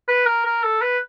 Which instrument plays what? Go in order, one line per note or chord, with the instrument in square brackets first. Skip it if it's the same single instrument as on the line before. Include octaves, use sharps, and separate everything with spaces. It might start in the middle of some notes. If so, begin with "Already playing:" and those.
[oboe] B4
A#4
A#4
A4
B4